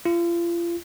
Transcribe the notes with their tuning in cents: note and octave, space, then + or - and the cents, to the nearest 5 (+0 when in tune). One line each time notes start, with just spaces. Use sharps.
F4 -35